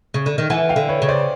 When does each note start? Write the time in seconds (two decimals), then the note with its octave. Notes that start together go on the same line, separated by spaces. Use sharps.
0.14 C#3
0.26 D3
0.38 D#3
0.50 E3 F#5 G#5
0.69 F5 G5
0.76 D3
0.89 B4 C#5
1.02 C#3
1.09 C5 D5